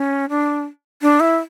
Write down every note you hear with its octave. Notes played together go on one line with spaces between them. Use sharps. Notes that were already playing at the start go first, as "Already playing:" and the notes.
Already playing: C#4
D4
D4
E4